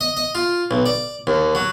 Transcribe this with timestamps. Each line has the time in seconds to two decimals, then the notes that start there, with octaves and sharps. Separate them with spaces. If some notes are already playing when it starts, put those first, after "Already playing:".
0.01 D#5
0.17 D#5
0.35 F4
0.71 B1
0.86 D5
1.27 D#2
1.55 F#3